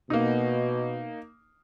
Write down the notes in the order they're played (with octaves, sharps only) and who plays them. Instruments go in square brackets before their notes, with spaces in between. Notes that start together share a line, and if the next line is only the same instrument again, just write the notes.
[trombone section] B2 [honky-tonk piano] A#3 D#4